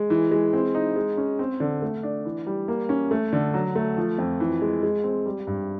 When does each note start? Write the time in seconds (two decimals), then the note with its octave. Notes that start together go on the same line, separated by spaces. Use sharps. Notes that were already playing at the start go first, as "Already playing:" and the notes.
Already playing: G#3
0.10 E3
0.31 G#3
0.53 C4
0.75 D#4
0.96 G#3
1.17 C#4
1.39 C4
1.60 D3
1.82 A3
2.03 D4
2.25 E3
2.47 G3
2.68 A#3
2.89 C#4
3.11 A3
3.33 D3
3.54 F#3
3.75 A3
3.97 F3
4.18 F2
4.40 E3
4.62 G#3
4.83 G#3
5.04 C4
5.26 G3
5.47 G2